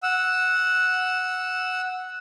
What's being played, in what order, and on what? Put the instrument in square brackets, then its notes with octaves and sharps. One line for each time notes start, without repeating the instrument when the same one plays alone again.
[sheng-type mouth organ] F#5 E6